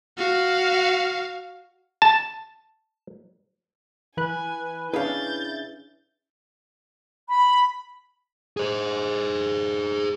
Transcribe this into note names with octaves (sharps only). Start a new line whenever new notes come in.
F#4 F5
A5
E3 B4 G#5 F#6
C#4 D4 E4 G#4 B4 F5 G6 A6
B5
G#4 C5